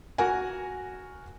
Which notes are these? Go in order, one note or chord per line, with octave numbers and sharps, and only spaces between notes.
F#4 A#4 F#5 G#5